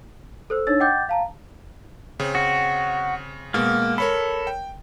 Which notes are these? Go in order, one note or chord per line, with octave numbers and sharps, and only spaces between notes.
A4 C5 E6
D4 D#4 C#5 E6 A6
D#5 F#5 G5 D6 G6 A6
F5 A5 A#5
C#3 C4
F#4
B2 G#3 A#3
A4 A#4 C#5 B5
G5